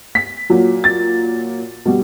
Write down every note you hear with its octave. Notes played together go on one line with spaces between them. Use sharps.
B6
A#2 F#3
A6
B2 G3